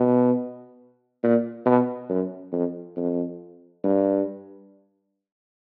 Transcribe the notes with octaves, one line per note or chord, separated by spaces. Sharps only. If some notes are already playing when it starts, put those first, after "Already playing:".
Already playing: B2
A#2
B2
F#2
F2
F2
G2